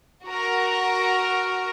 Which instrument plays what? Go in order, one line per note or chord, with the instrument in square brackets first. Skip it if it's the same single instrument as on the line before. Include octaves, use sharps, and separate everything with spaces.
[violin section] F#4 A#4